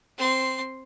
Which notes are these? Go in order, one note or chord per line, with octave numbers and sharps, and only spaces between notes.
C4 C6